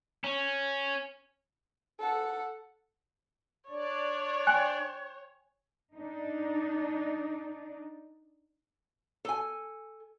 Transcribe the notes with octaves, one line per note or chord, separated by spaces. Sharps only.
C#4
A4 F#5
D4 C#5 D5
G5 G#5 C6 F#6
D4 D#4
A4 G#5